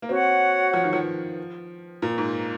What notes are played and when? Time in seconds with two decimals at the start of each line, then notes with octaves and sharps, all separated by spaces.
0.02 A#3
0.09 C4 F#4 C#5 F#5
0.74 F3
0.84 D#3
0.93 F3
2.02 A#2
2.18 G#2